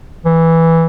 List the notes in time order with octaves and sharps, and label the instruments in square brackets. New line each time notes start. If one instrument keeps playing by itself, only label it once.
[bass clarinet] E3